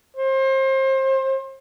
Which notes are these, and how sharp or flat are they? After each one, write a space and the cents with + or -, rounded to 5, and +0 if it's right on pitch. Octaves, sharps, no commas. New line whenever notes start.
C5 +30